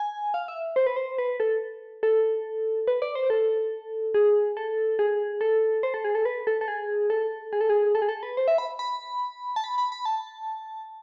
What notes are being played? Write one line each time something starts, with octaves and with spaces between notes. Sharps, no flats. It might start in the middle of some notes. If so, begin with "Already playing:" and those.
Already playing: G#5
F5
E5
C5
B4
C5
B4
A4
A4
B4
D5
C5
A4
G#4
A4
G#4
A4
C5
A4
G#4
A4
B4
A4
A4
G#4
A4
G#4
A4
G#4
A4
G#4
A4
B4
C5
E5
B5
B5
A5
B5
B5
B5
A5